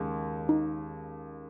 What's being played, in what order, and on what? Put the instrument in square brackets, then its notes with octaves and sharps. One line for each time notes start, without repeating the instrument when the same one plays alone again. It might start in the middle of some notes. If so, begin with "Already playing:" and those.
Already playing: [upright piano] D#2 C#3 G#3
[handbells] D#4